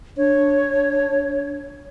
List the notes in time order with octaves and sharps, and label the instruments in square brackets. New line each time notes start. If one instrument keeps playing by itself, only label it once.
[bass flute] D4 [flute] C#5